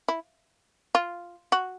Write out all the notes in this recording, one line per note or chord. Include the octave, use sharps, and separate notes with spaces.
E4
F4
F#4